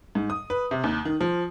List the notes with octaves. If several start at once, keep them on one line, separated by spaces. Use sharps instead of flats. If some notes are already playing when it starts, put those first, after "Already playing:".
G#2
D#6
B4
C3
D#2
D#3
F3